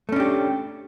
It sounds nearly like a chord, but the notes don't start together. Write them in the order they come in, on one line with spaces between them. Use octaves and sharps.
A3 C#4 D4 G4